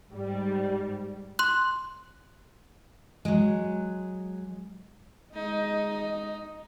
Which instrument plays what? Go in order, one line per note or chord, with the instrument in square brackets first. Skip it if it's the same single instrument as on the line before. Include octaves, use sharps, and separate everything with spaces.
[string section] G#2 G3
[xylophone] C6 F#6
[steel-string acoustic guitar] F#3 G#3
[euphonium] G#3 [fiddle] D#4 [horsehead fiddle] D#5